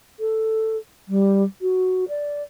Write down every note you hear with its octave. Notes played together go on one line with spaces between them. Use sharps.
A4
G3
F#4
D5